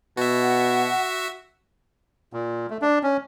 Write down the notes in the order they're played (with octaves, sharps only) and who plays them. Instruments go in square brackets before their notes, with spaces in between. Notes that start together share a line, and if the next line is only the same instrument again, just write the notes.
[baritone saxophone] B2 [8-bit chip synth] F#4 E5
[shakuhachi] F#5
[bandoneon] A#2
A3
D4
C#4